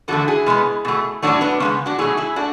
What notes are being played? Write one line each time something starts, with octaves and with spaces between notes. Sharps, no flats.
E2 D3 A3 F#4 A4
E4 G#4
B2 G#3 B3
B2 A3
A2 F#3 A3 D4 F#4
B3 D4
C#3 G#3 B3 C#4
D4 F#4
B2 F#3 A3 E4 G#4
E4 G#4
A3 D4 F#4